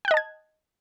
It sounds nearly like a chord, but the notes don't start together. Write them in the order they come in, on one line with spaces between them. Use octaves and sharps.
G5 F#6 D#5 A5 G#6